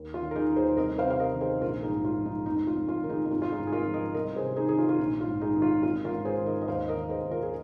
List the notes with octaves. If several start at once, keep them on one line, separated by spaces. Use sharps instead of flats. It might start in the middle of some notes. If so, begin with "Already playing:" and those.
Already playing: D#2
F4
D#3
A#4
D#4 G#4
D#2
G#4 C5
C2 A#4 D#5
C5 F5
C3
F5
A#4 D#5
D#3
G#4 C5
A#1 F4 A#4
D#4 G#4
G#2
F4
F3
D#4
F1 D#4
F4
F2
F4
D#3 A#4
D#4 G#4
D#4
G#1 F4
F4
D#4 G#4
G#2
G#4
F4 A#4
F3
A#4 D#5
C2 A#4 D#5
G#4 C5
C3
D#4 G#4
D#3 G#4
F4
F4
A#1 D#4
F4
G#2
D#4 G#4
D#3
F4
G#1 F4
F4 A#4
G#2
G#4 C5
D#3
A#4 D#5
D#5
D#2 C5 F5
A#4 D#5
D#3
G#4 C5
D#2
F4 A#4
G#4